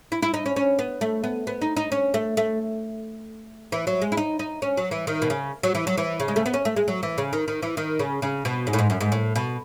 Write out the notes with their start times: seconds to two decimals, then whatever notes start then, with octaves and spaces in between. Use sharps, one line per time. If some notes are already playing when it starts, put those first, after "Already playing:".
0.12 E4
0.22 E4
0.34 D#4
0.46 C#4
0.56 C#4
0.79 B3
1.01 A3
1.24 B3
1.47 B3
1.61 D#4
1.77 D#4
1.92 C#4
2.14 A3
2.37 A3
3.72 E3
3.87 F#3
4.02 G#3
4.12 E4
4.17 D#4
4.39 D#4
4.62 C#4
4.77 F#3
4.91 E3
5.07 D#3
5.22 B2
5.30 C#3
5.63 F#3
5.75 E3
5.87 F#3
5.98 E3
6.20 C#3
6.28 G#3
6.36 A3
6.46 B3
6.54 C#4
6.65 A3
6.76 G#3
6.88 F#3
7.03 E3
7.18 C#3
7.33 D#3
7.48 D#3
7.62 E3
7.77 D#3
7.99 C#3
8.22 C#3
8.45 B2
8.67 G#2
8.73 A2
8.79 G#2
8.90 F#2
9.01 G#2
9.12 A2
9.36 B2